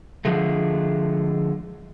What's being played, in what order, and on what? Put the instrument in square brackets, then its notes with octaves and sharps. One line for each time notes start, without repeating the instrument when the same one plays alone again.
[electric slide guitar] D3 F3 G#3 A3